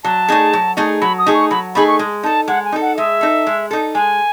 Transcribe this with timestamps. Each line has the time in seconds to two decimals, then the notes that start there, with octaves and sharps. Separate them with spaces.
0.04 F#3 A5
0.28 A3 D#4 G#4
0.53 F#3
0.77 A3 D#4 G#4
1.01 F#3 B5
1.18 D#6
1.27 A3 D#4 G#4
1.34 C#6
1.51 F#3 B5
1.75 A3 D#4 G#4 B5
1.87 C#6
1.99 G#3
2.23 D#4 A4 A5
2.48 G#3 F#5
2.65 G#5
2.72 D#4 A4
2.81 F#5
2.97 G#3 E5
3.21 D#4 A4
3.47 G#3
3.71 D#4 A4
3.95 G#3 G#5